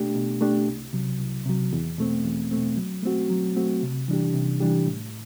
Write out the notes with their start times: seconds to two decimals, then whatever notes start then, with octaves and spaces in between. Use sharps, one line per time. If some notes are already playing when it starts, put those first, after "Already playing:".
Already playing: B2 A3 D4 G4
0.15 B2
0.41 A3 D4 G4
0.68 C2
0.93 C3 F#3
1.19 C2
1.46 C3 F#3
1.73 E2
1.98 B2 A3 C4
2.25 E2
2.51 B2 A3 C4
2.77 F#3
3.03 A3 C4 F#4
3.30 F#3
3.56 A3 C4 F#4
3.82 C3
4.08 E3 G3 D4 G4
4.34 C3
4.60 E3 G3 D4 G4
4.86 A2